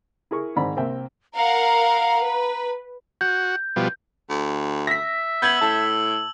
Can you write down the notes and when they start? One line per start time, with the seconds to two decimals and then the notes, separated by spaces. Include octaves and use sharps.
0.31 E4 G#4 A#4 C#6
0.56 G#2 D#3 C4 D5 A#5 B5
0.76 C2 A#3 C4 E5 G5
1.35 A#4 F5 F#5 A#5
2.22 B4
3.21 F#4 G6
3.76 B2 F3 G3
4.30 D2
4.87 E5 A#6 B6
5.42 B3 E6 G6 G#6 F#7
5.61 A2 A5